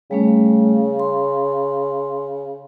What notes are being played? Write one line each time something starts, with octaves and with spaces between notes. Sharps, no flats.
C#3 G3 A3 C#4
C6